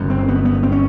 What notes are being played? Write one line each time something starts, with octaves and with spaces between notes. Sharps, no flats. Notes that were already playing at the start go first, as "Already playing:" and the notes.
Already playing: G1 F#2 C#3
C4
B3
B3
C4
C#4